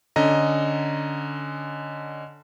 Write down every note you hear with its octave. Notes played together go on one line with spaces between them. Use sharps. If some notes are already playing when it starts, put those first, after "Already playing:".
D3 C#4 D#5 A#5